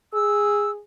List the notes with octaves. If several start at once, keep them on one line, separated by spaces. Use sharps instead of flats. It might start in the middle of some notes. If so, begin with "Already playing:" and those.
G#4 E6